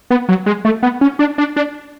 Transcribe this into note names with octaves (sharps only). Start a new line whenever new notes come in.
B3
F#3
G#3
A3
B3
C#4
D4
D4
D4